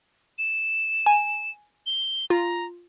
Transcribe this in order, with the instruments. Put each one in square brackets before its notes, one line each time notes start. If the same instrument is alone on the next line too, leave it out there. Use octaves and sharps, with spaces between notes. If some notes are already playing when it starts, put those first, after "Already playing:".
[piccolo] E7
[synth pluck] G#5
[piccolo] G7
[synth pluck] F4 [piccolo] A#5